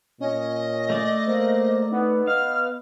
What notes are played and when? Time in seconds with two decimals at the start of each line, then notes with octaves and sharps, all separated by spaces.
0.20 A#2 C#4 D#5
0.90 A3 D5
1.27 A#3 C5
1.92 B3 D#4
2.27 D#5 F5 F6